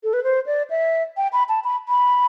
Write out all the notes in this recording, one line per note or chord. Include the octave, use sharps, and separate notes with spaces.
A4
B4
C5
D5
E5
G5
B5
A5
B5
B5